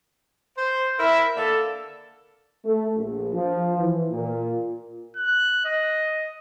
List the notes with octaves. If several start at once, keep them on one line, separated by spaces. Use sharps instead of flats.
C5
E4 A#4 E5
D3 A#3 A4
A3
A#1
F3
E3
A#2
F#6
D#5